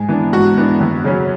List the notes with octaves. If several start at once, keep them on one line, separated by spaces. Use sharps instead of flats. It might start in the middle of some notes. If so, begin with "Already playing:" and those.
Already playing: G#2 G#4
E3 B3 D4
G#2 F#4
E3 B3 D4
F#2
C#3 F#3 C#4